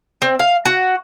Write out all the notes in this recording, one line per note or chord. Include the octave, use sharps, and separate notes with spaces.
C4
F5
F#4